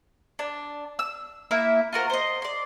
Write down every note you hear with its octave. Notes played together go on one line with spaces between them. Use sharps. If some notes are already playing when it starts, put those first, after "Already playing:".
D4
E6
A#3 E4 E5
F4 F#4 A#4 C5
C5 D#5
D5 C6